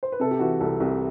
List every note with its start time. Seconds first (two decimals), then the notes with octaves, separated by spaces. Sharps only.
0.03 C5
0.12 B4
0.20 C3 A4
0.31 G4
0.39 E3 F#4
0.60 C2 A4
0.80 C2 G4